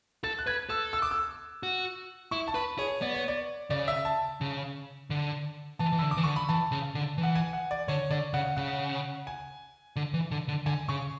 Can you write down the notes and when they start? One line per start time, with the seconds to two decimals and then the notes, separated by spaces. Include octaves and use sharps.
0.24 A4 A6
0.39 F#6
0.47 B4 G#6
0.69 A4 E6
0.93 E6
1.02 D6
1.11 E6
1.63 F#4
2.31 E4 C#6
2.48 A5
2.55 B4 B5
2.78 G#4 C#5
3.02 B3 D5
3.15 C#5
3.28 D5
3.70 C#3 D5
3.88 E5
4.05 A5
4.41 C#3
5.10 D3
5.79 E3 A5
5.92 E3
5.99 D3 E6
6.11 D6
6.17 E3
6.24 D3 C#6
6.36 B5
6.49 E3 A5
6.72 C#3
6.95 D3
7.18 E3
7.23 F#5
7.35 G#5
7.53 F#5
7.71 D5
7.88 D3 C#5
8.10 D3 D5
8.33 C#3 F#5
8.57 C#3 F#5
9.27 G#5
9.96 D3
10.14 E3
10.31 D3
10.48 D3
10.66 D3 G#5
10.89 C#3 C#6